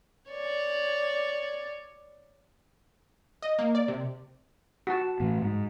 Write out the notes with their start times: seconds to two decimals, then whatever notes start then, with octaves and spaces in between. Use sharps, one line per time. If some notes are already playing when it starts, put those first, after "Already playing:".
0.29 C#5 D5
3.42 D#5
3.59 A#3
3.75 D5
3.88 C3
4.87 F#4 A5
5.20 A2 E3
5.42 G#2